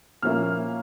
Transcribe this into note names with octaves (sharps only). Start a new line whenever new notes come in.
A#2 F3 A#3 C#4 E4 F6